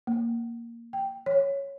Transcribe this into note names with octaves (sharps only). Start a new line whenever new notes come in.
A#3
G5
C#5